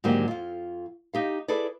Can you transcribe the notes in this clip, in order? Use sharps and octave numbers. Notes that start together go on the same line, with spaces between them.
G#2 D3 D#3 F#3 A#3 G4
F2 F4
D#4 G4 F5
E4 G#4 A4 B4 D5